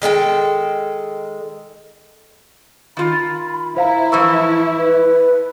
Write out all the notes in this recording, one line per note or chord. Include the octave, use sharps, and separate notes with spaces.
D#3 G#3 A4 G5
D#3 F4 B5
E4 C5 E5 F5 A#5
A2 E3 F3 E5 C#6 E6
B4